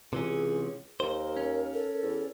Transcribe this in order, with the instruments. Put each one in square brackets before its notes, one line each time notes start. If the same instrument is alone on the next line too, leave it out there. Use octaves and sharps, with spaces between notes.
[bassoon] C#2 [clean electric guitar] C3 E3 C#4 [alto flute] G#4
[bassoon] D#2 [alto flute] A#4 [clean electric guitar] C5
[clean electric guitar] C#4
[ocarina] A4
[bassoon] E2